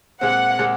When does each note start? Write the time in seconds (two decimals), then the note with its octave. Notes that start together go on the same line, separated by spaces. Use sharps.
0.21 A#2 G#3 C4 F#5
0.59 A#2 G#3 C4